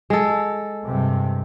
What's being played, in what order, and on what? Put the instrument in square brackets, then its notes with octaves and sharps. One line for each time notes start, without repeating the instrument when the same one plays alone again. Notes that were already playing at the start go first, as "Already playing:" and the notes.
[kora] G#3 A4
[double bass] G2 C3